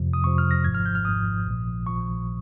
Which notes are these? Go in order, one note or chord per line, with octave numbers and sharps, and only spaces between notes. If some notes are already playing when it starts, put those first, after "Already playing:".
Already playing: F2 C3 F3
D#6
F2 C3 F3 C#6
F6
A#6
G#1 G#2 F3 G#6
F6
G6
F6
G#1 G#2 F3 D#6
A#1 A#2 F3
A#1 A#2 F3 C#6